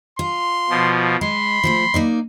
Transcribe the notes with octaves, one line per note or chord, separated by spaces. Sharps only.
F4 C6
B2 F3
G#3 B5 C6
F3 G#3 A3
A#3 D#4 D5